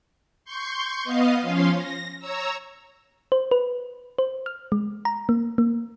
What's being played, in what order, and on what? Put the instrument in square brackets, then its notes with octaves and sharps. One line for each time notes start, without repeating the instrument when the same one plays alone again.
[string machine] C6 C#6 G6
B3 D#5 F5 D#6
F3 C#4 F5 C6
A#6
C#5 A#5 E6
[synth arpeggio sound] C5
B4
C5
F6
G#3
A#5
A#3
A#3